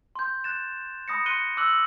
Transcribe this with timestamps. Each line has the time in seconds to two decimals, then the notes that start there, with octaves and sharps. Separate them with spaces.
0.15 C6 G6
0.44 F#6 A6 E7
1.08 B5 D#6 A#6 C#7
1.25 C6 F#6 C#7 D#7 G7
1.57 D6 E6 F#6 F#7